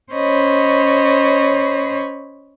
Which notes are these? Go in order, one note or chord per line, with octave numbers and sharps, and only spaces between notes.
C#4 C5 C#5 D#5 B5